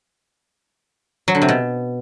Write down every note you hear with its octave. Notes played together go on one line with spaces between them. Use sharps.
F#3
D3
C3
B2